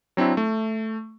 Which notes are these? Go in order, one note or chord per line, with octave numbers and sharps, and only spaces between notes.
F#3 C4 D4 E4
A3